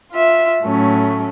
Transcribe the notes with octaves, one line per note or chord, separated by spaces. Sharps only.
F4 E5
A2 F#3 A3 C#4